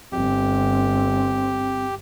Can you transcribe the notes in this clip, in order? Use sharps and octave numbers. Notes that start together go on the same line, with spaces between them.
G1 C4 G4